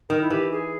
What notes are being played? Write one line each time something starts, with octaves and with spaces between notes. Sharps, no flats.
D#3 A#4
E4
E3 G4
G#4